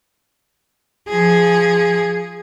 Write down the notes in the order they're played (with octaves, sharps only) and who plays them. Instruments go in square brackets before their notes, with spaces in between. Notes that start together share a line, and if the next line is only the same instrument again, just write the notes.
[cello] F3 G#4